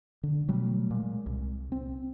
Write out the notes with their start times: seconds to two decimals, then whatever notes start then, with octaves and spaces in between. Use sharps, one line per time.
0.23 D3
0.48 B2 F#3 G3 A3
0.91 A#2 G#3
1.26 C2
1.72 C4